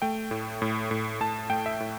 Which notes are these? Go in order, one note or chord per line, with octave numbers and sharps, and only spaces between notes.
A3 G5
A2
A2
A2
A2 A5
A3 G5
E5
A2